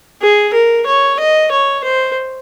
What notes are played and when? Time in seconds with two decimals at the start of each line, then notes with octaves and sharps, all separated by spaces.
0.22 G#4
0.54 A#4
0.87 C#5
1.19 D#5
1.52 C#5
1.84 C5